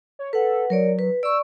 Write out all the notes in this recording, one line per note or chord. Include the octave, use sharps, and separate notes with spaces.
C#5
A4 B4 F#5
F#3 A#4 C#5 D5
B4
D5 C#6 E6